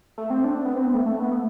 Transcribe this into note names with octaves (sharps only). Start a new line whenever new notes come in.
A3
C4
D4
B3
C4
B3
A3
A3
B3
A3